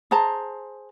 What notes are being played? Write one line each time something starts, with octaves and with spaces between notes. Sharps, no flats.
G#4 C5 A5 A#5